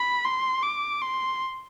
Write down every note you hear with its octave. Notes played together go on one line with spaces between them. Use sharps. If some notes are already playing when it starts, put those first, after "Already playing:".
Already playing: B5
C6
D6
C6